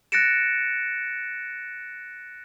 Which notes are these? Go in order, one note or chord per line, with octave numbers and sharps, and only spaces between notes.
F#6 A6 A#6 C#7 D7 E7